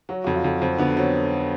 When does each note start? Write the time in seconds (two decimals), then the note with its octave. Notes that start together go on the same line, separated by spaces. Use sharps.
0.09 F#3 F#4
0.24 F2 F#4
0.36 F4
0.44 F2
0.61 F2 C4
0.78 D3 B3
0.97 F#3 C4